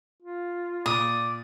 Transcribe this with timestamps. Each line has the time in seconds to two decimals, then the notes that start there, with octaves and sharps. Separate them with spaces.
0.22 F4
0.86 A#2 D5 D#6